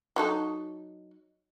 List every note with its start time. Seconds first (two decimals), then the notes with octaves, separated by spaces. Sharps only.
0.16 F#3 D#4 A4